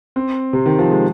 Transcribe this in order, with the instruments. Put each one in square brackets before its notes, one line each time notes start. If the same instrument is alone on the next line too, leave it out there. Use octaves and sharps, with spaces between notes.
[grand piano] C4
C3
D#3
F3
G#3